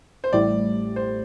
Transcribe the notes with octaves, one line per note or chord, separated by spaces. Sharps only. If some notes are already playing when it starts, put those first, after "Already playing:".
C5
A1 A2 G3 D5
C5